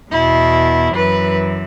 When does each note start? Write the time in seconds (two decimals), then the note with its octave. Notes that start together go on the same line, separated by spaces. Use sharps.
0.11 E2 B2 E4
0.95 F#2 E3 B4